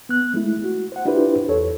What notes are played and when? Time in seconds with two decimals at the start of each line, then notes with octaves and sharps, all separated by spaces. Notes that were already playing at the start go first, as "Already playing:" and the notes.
0.09 B3 F#6
0.34 G#3 A3 E4
0.64 F#4
0.92 C5 F#5
1.05 D4 E4 F4 G4 B4 C5
1.48 E2 A4 C#5